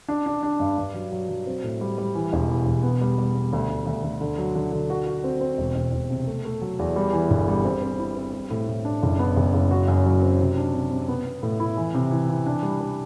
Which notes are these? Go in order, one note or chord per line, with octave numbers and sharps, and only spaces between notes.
D4
D4
D4
G2
G2
F#3
F#3
F#3
C4
A2
G3
G3
E3
E1
E3
E1
B3
G3
G3
B3
D2
D2
D2
D2
D3
F#3
D3
D3
F#4
F#4
C4
C4
E1
E1
E1
C3
A3
A3
F#3
E2
G3
E3
G1
G3
C4
C4
E4
C4
G3
A2
A2
D4
F#1
B3
F#1
F#1
F#4
F#2
F#3
C4
C3
D4
C3
C3
B3
B3
A2
E4
E3
C3
E3
E3
D4
G3
G3